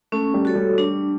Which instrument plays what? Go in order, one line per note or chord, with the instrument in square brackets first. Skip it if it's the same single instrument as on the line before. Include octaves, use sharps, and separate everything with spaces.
[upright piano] A3 [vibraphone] C#4
[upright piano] G3
[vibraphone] F#4 A4 C#5
[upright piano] G3
[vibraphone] D4